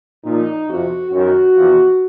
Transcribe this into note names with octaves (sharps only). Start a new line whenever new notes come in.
A#2 F3 D#4
F2 C3 F3 F#4
F#2 D#3 F#4
E2 C3 F3